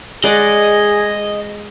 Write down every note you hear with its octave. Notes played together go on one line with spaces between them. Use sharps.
G#3 G#4 D5 D#5 F#5